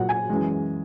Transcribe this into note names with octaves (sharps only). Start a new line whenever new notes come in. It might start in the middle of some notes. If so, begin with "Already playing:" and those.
Already playing: A#2 F#3 F#5
G#5
F#2 E3 G#3